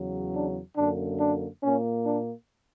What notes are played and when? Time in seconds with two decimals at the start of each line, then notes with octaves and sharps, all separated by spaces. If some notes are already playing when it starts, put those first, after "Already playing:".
Already playing: E2 C#3 F#3
0.34 D4
0.77 F#2 D3 A#3 D4
1.20 D4
1.63 A#2 A#3 C#4
2.06 D4